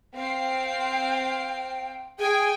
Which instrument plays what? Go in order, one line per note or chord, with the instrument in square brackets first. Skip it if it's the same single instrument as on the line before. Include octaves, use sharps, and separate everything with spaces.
[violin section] C4 F5 C7 [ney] G5
[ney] G#4 [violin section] G5 G#5